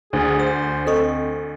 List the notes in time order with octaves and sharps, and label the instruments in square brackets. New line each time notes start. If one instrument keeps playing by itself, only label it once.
[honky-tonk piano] D2 [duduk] G#4
[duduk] C5 [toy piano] E6
[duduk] C4 [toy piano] A4 D#5 C#6